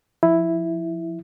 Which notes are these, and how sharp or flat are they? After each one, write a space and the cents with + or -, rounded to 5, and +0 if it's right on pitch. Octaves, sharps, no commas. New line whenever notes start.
F3 +0 E4 +0